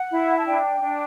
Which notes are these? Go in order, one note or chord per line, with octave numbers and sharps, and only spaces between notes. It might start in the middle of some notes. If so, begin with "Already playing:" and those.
Already playing: F#5
E4
A5
D4 G5
D4